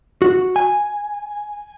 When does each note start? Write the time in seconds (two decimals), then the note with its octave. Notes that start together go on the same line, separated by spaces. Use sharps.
0.22 F#4
0.56 G#5